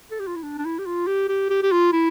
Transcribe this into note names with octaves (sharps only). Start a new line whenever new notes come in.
A4
G4
F4
E4
D4
D4
E4
G4
F4
G4
G4
G4
G4
F4
E4